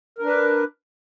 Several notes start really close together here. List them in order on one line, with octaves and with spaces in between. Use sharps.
A#4 D4 B4